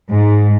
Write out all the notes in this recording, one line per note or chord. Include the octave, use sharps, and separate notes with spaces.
G#2